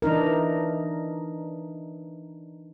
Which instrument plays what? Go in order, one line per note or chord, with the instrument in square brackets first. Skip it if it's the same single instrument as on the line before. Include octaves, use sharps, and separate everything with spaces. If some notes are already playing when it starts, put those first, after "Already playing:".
[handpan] E3 D4 D#4 A#4